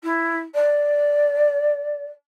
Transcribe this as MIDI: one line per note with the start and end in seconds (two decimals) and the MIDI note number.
0.03 0.38 64
0.54 2.06 74